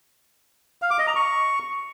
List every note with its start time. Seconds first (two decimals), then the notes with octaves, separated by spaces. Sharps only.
0.82 F5
0.90 D6
0.99 D#5
1.07 A#5
1.16 C#6